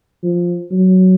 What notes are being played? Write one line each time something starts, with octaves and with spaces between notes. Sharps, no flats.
F3
F#3